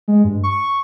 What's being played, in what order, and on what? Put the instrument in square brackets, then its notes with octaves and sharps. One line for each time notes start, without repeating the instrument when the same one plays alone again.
[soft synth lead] G#3
G2
C#6